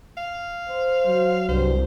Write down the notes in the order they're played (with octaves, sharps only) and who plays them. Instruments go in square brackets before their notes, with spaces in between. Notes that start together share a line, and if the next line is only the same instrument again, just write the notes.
[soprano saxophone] F5
[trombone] C5
[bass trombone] F#3
[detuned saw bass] C2 [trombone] G2 [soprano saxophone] C5